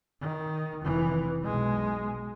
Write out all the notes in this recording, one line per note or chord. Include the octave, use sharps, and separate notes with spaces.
D#3
F1 E3
B1 G#3